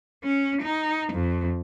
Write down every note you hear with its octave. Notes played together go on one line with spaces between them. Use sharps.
C#4
D#4
F2